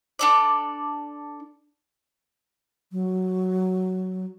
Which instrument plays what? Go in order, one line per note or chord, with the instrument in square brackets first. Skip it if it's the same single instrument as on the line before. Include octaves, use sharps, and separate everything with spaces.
[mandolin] D4 A4 D5
[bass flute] F#3